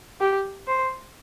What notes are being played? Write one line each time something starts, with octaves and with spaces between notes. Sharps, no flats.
G4
C5